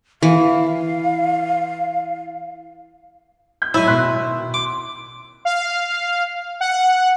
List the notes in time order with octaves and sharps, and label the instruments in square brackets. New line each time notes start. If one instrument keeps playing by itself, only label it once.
[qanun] E3 [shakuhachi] F5
[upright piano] G6
[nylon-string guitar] F#3 G#3 [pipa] E4 [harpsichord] E5 G#5
[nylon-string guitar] B2 D#3 [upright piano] C6 F#6 B6
[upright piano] C6 [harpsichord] D6
[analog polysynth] F5
F#5